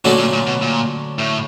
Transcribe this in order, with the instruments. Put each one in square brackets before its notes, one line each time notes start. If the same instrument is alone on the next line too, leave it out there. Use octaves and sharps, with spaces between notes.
[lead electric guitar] A#2 [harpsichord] D3 F#3 A3 C#4 F#4
[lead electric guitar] A#2
A#2
B2
A#2
A2